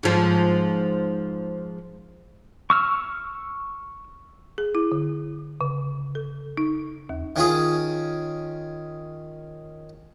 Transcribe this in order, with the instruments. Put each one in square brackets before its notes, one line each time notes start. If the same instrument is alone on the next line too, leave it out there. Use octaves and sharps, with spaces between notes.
[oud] G#2 F3
[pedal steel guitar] C#6 E6 F6
[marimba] G#4
E4
D3
C#3
A4
D#4
D#2
[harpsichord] D#3 C#4 F4 G#4